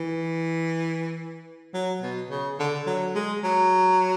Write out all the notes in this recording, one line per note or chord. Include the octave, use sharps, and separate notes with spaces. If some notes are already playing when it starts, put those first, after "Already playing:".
Already playing: E3
F#3
B2
C#3
D3
F#3
G#3
F#3